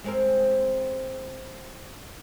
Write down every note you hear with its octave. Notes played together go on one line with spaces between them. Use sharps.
G#3 C4 A#4